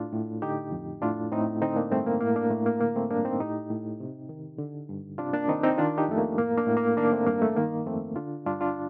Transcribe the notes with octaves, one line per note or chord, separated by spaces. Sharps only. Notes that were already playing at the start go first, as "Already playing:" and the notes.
Already playing: A2 D4 F4
A2
D3 D#4 G4
F2
A2 D4 F4
A2 C4 D#4
D3 C4 D#4
A#3 D4
G2 A3 C4
A#3
A2 A#3
A#3 D4
A2 A3
A#3
D3 A#3
A3 C4
G2 A#3 D4
C4 D#4
A2 D#4 G4
A2
C3
D#3
D3
G2
C3 D4 F4
A#3 D4
D#3 C4 D#4
C4 D#4
D#3 D4 F4
D#4 G4
F2 A3
A#3
A2 A#3
A#3 D4
A2
A#3
D#3 A#3 D4
A3 C4
G2 A#3
A3
D#3 A#3
F2 A3 C4
D3 D4 F4
G2 D4 F4
D4 F4